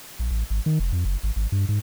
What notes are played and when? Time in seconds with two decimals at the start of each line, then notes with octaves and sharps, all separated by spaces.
0.19 A#1
0.31 A1
0.50 G#1
0.66 D#3
0.80 F1
0.93 F2
1.05 F#1
1.23 G#1
1.36 G#1
1.52 G2
1.69 G#2